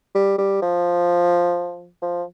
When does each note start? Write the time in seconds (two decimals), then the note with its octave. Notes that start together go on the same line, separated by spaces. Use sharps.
0.15 G3
0.38 G3
0.62 F3
2.02 F3